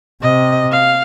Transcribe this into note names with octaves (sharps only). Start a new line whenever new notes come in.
C3 D#5
F5